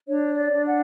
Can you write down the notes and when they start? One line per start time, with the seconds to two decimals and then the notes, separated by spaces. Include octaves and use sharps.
0.07 D4 C#5
0.37 D5
0.51 D4
0.66 F#5